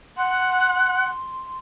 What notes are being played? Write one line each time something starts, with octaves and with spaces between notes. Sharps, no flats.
F#5 C6